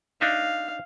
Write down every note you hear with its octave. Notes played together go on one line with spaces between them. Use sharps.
D4 D#4 E5 F5